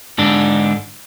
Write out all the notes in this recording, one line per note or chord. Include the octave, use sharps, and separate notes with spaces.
G#2 D3 D4